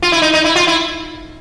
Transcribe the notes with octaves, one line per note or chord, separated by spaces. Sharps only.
F4
E4
D#4
D#4
E4
F4
E4